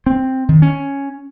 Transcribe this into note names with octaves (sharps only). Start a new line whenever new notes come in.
C4
D#3
C#4